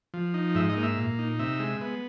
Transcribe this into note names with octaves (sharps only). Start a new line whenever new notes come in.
F3
D#4
G#2 E5
D#5
A#3
E5
A#2
D#4
C3 E5
G#3
B3